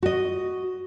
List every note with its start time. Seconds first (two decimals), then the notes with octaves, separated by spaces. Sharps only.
0.03 F#4 D#5